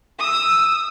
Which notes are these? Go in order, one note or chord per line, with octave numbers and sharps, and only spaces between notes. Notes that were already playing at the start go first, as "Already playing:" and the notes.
D#6 E6